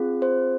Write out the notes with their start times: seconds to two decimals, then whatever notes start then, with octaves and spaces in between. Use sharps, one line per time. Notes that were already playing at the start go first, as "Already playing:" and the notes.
Already playing: C4 F4 G#4
0.22 C5